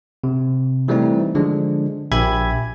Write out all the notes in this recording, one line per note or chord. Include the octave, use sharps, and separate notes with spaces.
C3
E3 G3 A3 C4 D#4
D3 F3 G#3 D4
A#1 G4 E5 G#5 B5 G#6